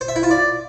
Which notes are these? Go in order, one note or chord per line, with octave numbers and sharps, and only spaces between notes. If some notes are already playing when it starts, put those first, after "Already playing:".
C5
E5
E4
F4
D5